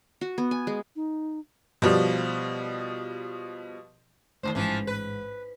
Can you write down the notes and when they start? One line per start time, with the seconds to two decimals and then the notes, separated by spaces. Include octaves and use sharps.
0.21 F#4
0.38 B3
0.51 G#5
0.67 G#3
0.96 D#4
1.82 B2 F3 G3
4.43 D#2 C#3 A3 C5 C7
4.55 A1 G#2 E3 F3
4.87 B4